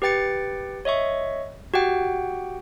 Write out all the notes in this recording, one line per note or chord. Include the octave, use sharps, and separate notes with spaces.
G4 B4 G5 A6 C#7
C#5 D#5 E5 C#6
F#4 G4 F#5 G5